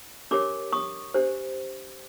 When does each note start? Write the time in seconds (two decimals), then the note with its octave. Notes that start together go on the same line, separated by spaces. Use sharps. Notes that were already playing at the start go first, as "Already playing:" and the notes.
0.31 D4 G4 A#4 C#5 C6 D6
0.73 C#6 D#6
1.14 D4 G4 C5